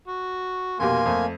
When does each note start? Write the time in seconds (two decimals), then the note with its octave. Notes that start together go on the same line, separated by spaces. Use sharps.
0.08 F#4
0.80 F1 B2 A#3 G4 G#5 C6
1.06 F2 A3